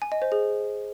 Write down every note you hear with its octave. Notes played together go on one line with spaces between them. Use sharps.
G#5
D#5
C5
G#4